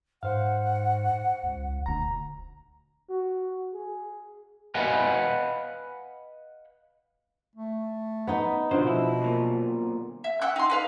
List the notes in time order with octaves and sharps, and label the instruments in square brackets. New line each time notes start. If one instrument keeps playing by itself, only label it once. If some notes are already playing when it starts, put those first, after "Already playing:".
[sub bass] G#2 [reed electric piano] C5 F5 [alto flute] F#5
[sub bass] C#2
[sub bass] D#1 [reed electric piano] D2 A#5
[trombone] F#4
G#4
[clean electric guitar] B4 D#5 F5 F#5 G#5 B5
[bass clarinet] A3
[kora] B3 D#4 D#5
[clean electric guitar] F#2 C5 [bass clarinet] B2 [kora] D3 F3
[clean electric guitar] E4
B1 A#2
[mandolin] E5
F#5 G5 E6 F#6
D#4 C6
D#4 B4 F5